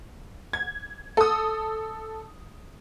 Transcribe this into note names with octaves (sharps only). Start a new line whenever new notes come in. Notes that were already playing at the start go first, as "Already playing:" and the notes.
G#6
A4 D#6